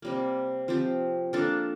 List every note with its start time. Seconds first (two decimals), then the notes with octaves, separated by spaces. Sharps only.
0.02 C3 G3 A#3
0.68 F3 C4 G4
1.33 A#3 D4 F4 A4